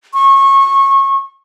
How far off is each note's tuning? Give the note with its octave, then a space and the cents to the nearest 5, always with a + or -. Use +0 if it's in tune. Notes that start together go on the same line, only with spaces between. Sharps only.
C#6 -25